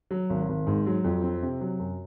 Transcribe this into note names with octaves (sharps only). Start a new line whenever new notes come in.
F#3
G#1
G#1
G#2
F#3
F2
C4
C3
F#3
F#2